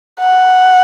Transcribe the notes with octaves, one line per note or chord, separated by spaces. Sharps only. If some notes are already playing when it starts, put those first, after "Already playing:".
F#5